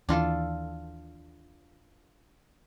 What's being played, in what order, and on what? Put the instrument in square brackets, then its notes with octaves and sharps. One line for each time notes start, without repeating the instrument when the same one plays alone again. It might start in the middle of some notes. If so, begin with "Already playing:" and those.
[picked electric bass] D#2 E3 [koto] D4 F4 A4